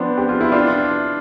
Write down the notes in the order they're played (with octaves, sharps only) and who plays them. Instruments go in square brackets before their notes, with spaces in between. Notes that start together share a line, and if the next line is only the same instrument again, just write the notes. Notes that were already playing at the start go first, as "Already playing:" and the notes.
Already playing: [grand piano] F3 B3 C4 D4
G4
F4
E4
D4 F4